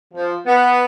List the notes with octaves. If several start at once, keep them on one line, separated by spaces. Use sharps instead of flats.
F3
B3